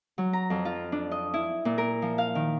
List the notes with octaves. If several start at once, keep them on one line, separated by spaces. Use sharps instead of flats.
F#3
A#5
F2
F4
D4
D#5
E4
A#2
A#4
F3
F5
D#3